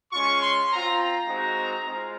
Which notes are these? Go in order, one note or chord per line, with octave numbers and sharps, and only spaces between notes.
G#3 C#4 F4 C#6
C6
C4 F4 A#5
A#5
G#3 C4 D#4 F#4
G#3 C4 F4